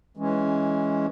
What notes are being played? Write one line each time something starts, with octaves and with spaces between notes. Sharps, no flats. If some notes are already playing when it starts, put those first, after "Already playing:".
E3 G#3 C#4